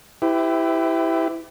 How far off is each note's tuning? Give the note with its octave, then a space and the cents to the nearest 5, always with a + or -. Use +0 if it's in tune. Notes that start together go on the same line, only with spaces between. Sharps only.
E4 +0 G4 +0 B4 +40